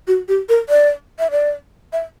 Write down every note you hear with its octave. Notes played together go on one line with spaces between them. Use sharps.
F#4
G4
A#4
D5
E5
D5
E5